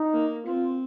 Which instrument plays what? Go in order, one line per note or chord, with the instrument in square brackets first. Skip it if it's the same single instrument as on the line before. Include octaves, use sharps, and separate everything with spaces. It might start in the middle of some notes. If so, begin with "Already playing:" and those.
Already playing: [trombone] D#4
[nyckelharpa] A#3
[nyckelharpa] C4 [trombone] F4